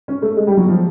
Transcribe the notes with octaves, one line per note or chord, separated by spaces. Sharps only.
C#4
A3
G#3
G3
F#3
F3